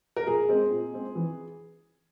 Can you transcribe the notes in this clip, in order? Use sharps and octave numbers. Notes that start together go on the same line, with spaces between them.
A#4
A#2 G#4
G#3 C4
A#2
G#3 C4
E3